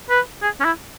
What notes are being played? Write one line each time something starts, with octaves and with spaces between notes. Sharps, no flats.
B4
G#4
C#4
E4